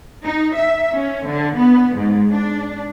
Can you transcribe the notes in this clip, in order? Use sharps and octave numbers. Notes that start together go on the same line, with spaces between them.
D#4
E5
C#4
D3
B3
G#2
D4